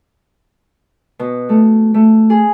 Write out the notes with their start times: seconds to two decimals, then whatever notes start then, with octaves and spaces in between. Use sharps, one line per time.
1.19 B2
1.49 A3
1.94 A3
2.30 G#4